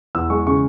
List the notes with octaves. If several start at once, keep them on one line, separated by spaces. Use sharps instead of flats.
E2 E6
G#3 C#6
C#3 C#6